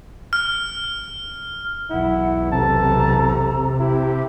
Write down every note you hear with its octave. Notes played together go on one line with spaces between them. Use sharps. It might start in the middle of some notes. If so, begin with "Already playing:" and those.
F6
B1 E2 E4 F#5
C3 A4 A5 A#5
E4 G4